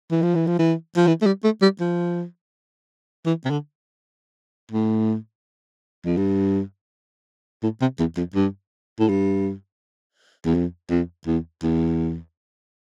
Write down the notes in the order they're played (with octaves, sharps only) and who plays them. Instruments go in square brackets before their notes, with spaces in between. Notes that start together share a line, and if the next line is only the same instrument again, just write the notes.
[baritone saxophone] E3
F3
E3
F3
E3
F3
E3
A3
G3
A3
G3
F3
E3
C3
D3
A2
F2
G2
A2
C3
E2
F2
G2
A2
G2
E2
F2
F2
E2
E2